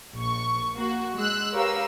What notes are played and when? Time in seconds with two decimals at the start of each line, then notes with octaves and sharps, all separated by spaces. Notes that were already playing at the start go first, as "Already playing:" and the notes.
0.14 A#1 C#6
0.75 A#3 F#4
1.16 G#3 E6 F#6
1.55 G4 A#4 B4 C#5 F5 E6